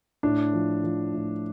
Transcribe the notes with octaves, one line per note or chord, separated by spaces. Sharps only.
A2 D4
F3
F3
A2